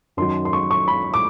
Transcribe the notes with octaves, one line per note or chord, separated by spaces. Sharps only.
F#2 D#3 F#3 C6
C6
C#6
C#6
B5
D6